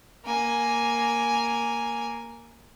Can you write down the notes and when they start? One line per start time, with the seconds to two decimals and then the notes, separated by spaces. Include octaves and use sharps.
0.25 A#3 G#5